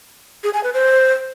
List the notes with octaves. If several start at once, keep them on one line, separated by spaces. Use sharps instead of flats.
G#4
G#5
B4
C5